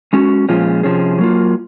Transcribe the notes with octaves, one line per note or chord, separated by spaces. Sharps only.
G#3 C#4 F#4
A#2 F3 G#3 C#4 F4
C3 F3 C#4 G#4
F#3 A#3 F4